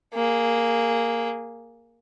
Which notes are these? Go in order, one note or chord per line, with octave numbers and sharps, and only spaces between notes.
A#3 G#4